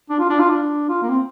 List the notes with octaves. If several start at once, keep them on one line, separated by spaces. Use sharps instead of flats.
D4
F4
D4
F4
D4
F4
A#3
C4